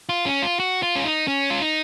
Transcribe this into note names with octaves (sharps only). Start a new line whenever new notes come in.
F4
C#4
F4
F#4
F4
C#4
D#4
C#4
F4
D#4